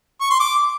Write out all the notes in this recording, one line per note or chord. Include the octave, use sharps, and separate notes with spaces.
C#6
C6
D6